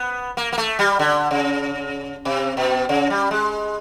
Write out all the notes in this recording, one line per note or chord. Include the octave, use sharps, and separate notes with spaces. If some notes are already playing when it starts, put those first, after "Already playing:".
Already playing: B3
A#3
A#3
A3
G3
D3
C#3
C3
B2
C#3
G3
G#3